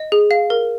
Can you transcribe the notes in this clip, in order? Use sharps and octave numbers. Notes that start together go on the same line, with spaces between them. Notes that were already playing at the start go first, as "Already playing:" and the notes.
Already playing: D#5
G#4
F5
A#4